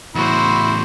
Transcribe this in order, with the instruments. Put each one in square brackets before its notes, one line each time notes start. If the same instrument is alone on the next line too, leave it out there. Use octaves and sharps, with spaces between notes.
[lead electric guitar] E2 A2 [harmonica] E4 [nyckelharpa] F#4 C5